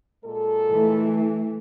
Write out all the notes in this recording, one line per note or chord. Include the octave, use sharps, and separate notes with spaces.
A#2 G#3 A4
E3 A3